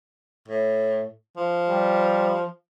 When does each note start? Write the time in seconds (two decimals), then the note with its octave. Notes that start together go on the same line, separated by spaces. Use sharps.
0.48 A2
1.36 F3
1.69 G3